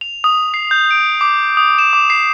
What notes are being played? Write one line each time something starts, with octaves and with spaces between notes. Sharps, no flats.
F7
D#6
C7
G6
D7
D6
D#6
E7
D6
C7